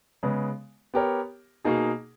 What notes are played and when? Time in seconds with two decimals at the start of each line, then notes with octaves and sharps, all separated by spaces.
0.23 C#3 G#3 B3
0.94 B3 G4 A#4 C#5
1.65 B2 A#3 D#4 G#4